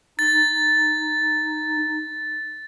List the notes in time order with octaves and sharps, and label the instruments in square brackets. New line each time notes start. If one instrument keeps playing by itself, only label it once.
[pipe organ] D#4 [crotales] A6